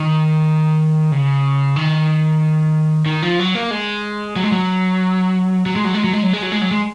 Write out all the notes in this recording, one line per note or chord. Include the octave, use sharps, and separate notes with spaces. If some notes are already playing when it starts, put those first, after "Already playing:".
Already playing: D#3
C#3
D#3
D#3
F3
F#3
A#3
G#3
F#3
G#3
F#3
F#3
G#3
F#3
G#3
F#3
G#3
F#3
G#3
F#3
G#3
F#3
G#3